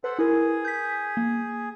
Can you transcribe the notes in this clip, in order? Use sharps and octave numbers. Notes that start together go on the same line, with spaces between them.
A4 B4 C5 F#5
E4 G#4 A#4
G6 B6
A#3